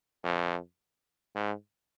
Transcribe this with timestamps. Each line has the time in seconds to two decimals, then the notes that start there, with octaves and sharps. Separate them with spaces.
0.24 F2
1.35 G#2